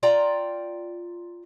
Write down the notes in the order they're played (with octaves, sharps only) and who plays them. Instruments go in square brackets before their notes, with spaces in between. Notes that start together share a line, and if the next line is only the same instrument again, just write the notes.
[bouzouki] F4 D5 G5 A#5